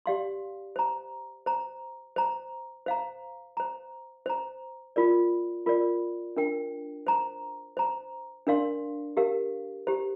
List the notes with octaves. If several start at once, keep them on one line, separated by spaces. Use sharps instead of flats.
G4 D5 F5 C6
C5 A#5
C5 A#5
C5 A#5
C5 F5 A#5
C5 A#5
C5 A#5
F4 A#4 D5
F4 A#4 D5
D4 A#4 G5
C5 A#5
C5 A#5
D4 A#4 D5 F5 C6
G4 A#4 F5
G4 C5 A#5